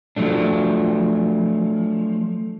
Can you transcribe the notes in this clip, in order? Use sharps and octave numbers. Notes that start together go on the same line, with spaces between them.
F3 F#3 A3 D4